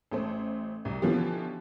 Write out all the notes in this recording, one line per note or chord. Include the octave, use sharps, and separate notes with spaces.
A1 A3 C5
C2
B2 D3 E3 F3 C#4 G4